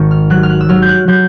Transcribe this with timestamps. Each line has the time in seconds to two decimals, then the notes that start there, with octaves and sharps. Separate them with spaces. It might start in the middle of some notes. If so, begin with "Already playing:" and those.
Already playing: G#1 D#3 C#6
0.11 F6
0.30 F#3 F#6
0.43 F6
0.50 F#6
0.61 E6
0.69 F#3 F6
0.82 G6
0.88 F#6
1.08 F#3 G6